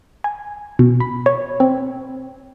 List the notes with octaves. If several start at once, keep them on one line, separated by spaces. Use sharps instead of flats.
G#5
B2
B5
C#5
C4